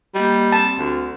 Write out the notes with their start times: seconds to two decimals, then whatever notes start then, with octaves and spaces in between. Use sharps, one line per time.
0.15 G3 A#3 G4 D#5
0.52 C4 A5
0.79 D2